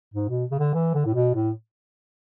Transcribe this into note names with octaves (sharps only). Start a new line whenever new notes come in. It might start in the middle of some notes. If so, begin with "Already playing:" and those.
G#2
B2
C#3
D3
E3
D3
A2
B2
A2